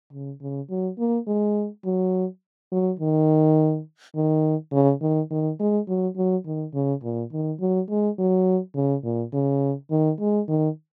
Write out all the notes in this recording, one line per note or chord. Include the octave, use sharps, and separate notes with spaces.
C#3
C#3
F#3
A#3
G#3
F#3
F#3
D#3
D#3
C#3
D#3
D#3
G#3
F#3
F#3
D#3
C#3
A#2
D#3
F#3
G#3
F#3
C#3
A#2
C#3
D#3
G#3
D#3